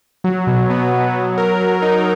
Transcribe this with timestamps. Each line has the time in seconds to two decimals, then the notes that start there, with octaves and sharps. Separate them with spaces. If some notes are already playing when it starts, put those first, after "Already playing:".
0.24 F#3
0.47 B2
0.70 B3
0.93 B2
1.14 F#3
1.38 A#4
1.60 F#3
1.82 D#4